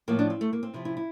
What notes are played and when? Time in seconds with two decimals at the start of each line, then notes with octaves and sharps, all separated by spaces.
0.08 A2 F3 A#3
0.19 D4
0.30 C4
0.41 A3
0.53 A#3
0.63 C4
0.74 C3 F3 E4
0.85 E4
0.97 E4